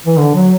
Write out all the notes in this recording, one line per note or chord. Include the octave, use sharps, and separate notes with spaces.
E3
D3
F#3